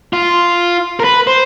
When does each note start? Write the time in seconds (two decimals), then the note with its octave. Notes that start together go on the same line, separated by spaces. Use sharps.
0.13 F4
1.00 A#4
1.04 B4
1.27 C5